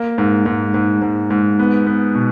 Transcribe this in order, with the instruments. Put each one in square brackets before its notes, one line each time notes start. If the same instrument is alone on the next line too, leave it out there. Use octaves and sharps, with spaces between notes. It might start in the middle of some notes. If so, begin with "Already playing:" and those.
Already playing: [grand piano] A#3
G#2
G#2
G#2
G#2
G#2
B3
B3
B2